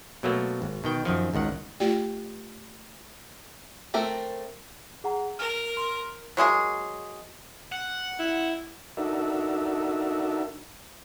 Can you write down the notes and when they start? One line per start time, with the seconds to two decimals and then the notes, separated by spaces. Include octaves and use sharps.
0.23 B2 F#3 A3 A#3
0.62 G#1
0.84 B2 D#3 G5
1.05 F#2 D#3 F3
1.34 G#1 C#2 D#3 F#5
1.80 A3 F4 G4 D5 G5
3.94 A3 C4 A4 A#4
5.04 G#4 F#5 A#5
5.39 A#4 F6
5.77 C6
6.37 F#3 G#3 G#4 A#4
7.72 F#5
8.19 E4
8.97 D4 D#4 F#4 A4 A#4 E5